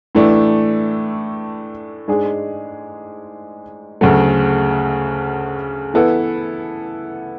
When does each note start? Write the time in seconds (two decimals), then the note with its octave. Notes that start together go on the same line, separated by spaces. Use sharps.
0.15 A2 E3 A3 D4
2.08 G#2 G#3 D4 G#4
4.01 D2 C#3 F#3 A3
5.94 E3 B3 E4 A4